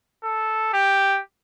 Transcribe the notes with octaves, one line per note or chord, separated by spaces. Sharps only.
A4
G4